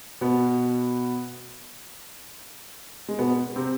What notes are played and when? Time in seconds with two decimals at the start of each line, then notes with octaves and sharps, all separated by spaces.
0.21 B2 B3
3.09 G#3
3.19 B2 B3
3.56 C3 C4